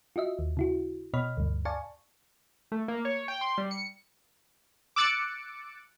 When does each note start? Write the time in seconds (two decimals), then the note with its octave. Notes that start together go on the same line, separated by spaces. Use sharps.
0.16 F4 F#4 D#5 E5
0.39 D#2
0.57 C#3 E4 F#4
1.14 B2 C#5 D#5 B5 F6
1.37 D2 G2
1.65 D5 F5 G#5 A5 C#6
2.72 A3
2.88 A#3
3.05 C#5
3.28 G5
3.41 C6
3.58 G3
3.71 C#7
4.96 D6 E6 F#6 A6 C#7 D7